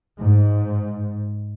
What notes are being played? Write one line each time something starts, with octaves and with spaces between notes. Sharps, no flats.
G#2